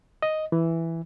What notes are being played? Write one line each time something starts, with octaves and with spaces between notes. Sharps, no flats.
D#5
E3